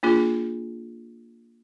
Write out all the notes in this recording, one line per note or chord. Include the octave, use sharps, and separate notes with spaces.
A#3 D4 F4 G#4